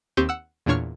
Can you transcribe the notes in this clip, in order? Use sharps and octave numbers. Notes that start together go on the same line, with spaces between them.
D#2 C4 G4 C#6 G6 D#7
F#5 E6
E2 A#2 D4 C#5 C#6 F6